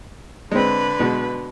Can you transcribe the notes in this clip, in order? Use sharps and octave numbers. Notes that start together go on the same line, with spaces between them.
D3 G#3 C4 B4
B2 G#3